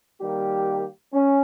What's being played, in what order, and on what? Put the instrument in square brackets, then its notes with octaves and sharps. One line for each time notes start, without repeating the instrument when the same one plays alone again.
[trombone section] D#3 G3 A#3 G4
C#4